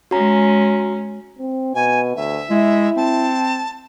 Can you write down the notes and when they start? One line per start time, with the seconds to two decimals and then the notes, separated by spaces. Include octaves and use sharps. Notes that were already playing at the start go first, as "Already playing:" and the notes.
0.11 G#3 C#4 F#4 A#5
1.39 C4
1.75 B2 G#5
2.16 D2 E5
2.51 G#3 E4
2.96 C4 A5